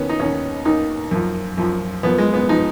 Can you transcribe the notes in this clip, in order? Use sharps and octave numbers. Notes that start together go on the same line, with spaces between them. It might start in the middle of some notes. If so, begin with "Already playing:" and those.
Already playing: D#2 D#3 B3 C#4
D#4
D#2 D#3 C#4
D#2 D#3 D#4
F#2 F3
F#2 F3
F#2 F3 B3
G#3
B3
F3 D#4